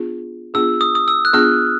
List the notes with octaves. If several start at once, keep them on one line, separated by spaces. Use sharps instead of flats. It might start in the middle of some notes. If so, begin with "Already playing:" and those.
Already playing: B3 D4 F4 G#4
B3 D4 F4 G#4 E6
D#6
D#6
E6
F#6
B3 D4 F4 G#4 F6